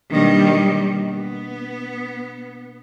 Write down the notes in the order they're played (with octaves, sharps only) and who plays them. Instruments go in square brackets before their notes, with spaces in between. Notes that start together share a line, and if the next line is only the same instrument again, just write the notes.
[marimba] B2 A#3 D4 [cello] D#3 G3
[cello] B3